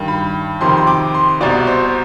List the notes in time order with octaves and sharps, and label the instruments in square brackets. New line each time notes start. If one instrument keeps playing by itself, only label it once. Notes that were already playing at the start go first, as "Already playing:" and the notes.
Already playing: [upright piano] G2 D#3
B5
F2 C3 D#3 C6
B5
C6
D6
C6
C2 B2 D5
C5